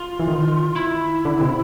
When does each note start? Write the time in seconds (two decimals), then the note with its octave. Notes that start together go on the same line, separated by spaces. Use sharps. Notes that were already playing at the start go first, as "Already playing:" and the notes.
Already playing: F4
0.19 E3
0.28 D#3
0.76 E4
1.25 D3
1.41 C3